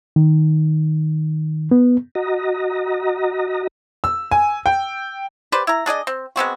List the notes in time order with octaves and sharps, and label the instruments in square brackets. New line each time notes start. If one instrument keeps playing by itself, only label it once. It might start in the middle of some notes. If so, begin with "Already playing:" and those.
[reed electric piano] D#3
B3
[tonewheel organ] F#4 D#5 A#5
[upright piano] E6
G#5
G5
[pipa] G4 B4 C5 D5
E4 A#5
D4 G#4 D5 D#5
C4
G#3 B3 C4 F#4